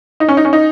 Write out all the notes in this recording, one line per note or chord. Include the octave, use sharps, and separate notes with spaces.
D#4
C#4
D#4
C#4
D#4